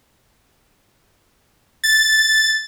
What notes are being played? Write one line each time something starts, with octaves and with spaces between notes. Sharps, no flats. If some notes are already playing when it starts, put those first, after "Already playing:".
A6